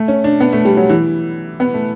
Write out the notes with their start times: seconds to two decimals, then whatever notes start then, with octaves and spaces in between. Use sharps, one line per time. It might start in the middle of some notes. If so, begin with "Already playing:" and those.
Already playing: A3
0.08 C#4
0.24 D4
0.41 B3
0.53 A3
0.65 G3
0.77 F#3
0.89 E3
1.60 B3
1.74 A3